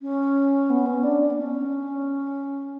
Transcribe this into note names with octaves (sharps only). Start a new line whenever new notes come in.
C#4
B3
C#4
D4
D4
B3
C#4